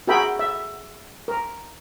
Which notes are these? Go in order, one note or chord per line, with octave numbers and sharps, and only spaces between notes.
F#4 G#4 A#4 E5 G5 B5
E5
A#4